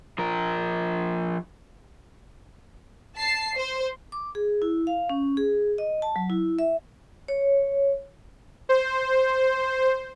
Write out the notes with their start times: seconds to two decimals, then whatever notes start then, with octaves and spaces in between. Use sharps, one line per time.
0.18 F3 A#4
3.16 A5 C7
3.56 C5
4.12 D6
4.35 G#4
4.62 E4
4.87 F5
5.10 C#4
5.37 G#4
5.78 D#5
6.02 A5
6.16 F#3
6.30 E4
6.59 E5
7.28 C#5
8.69 C5